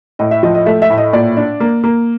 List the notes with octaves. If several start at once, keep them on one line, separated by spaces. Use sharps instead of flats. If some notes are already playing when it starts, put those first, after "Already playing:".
A2 D#5
E5
F3 D#5
D#5
A3 E5
E5
A2
D#5
A#2 D5
D4
A#3
A#3